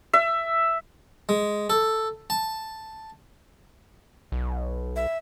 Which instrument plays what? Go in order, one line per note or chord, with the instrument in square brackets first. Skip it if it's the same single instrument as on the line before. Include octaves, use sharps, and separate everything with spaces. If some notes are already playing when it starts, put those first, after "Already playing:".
[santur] E5
[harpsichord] G#3
A4
A5
[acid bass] B1
[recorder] E5